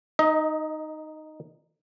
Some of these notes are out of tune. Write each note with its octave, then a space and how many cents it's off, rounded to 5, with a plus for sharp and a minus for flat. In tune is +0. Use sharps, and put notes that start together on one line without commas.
D#4 -5 D#5 +25